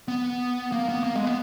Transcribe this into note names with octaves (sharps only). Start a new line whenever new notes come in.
B3
A#3
B3
A#3
G#3
B3